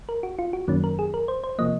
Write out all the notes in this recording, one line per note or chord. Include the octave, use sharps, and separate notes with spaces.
A#4
F#4
F4
F#4
F#2 D#3 F#3 A#3 C#4
A#4
G#4
A#4
C5
C5
C3 F3 A#3 D#5